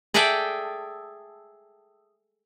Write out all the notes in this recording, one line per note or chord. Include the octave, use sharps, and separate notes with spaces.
G#4 A4 D5 E5 G5 A5